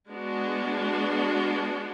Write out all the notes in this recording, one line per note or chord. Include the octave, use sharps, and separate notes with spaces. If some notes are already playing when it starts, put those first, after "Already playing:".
G#3 B3 D4 F#4